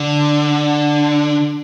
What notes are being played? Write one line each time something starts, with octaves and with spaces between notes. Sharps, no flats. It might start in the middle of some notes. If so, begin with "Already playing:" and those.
Already playing: D3